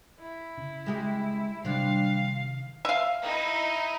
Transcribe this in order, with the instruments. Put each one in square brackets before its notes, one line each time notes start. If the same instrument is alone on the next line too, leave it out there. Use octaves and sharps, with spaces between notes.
[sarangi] E4
[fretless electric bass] C#3
[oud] G#3 G4 G#4
[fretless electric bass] C3 D#3 F#3 [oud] G3 C4 D4 [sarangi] F5
[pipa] E5 F5
[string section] D#4 E4